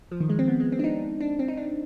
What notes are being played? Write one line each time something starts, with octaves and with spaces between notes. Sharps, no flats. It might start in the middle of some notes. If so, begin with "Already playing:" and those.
F3
D#3
G#3
C4
B3
G#3
C4
D4
D#4
D4
C4
D#4
D4